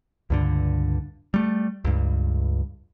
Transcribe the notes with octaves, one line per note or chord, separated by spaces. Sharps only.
C#2 G2 D3
G3 A3
C#2 G2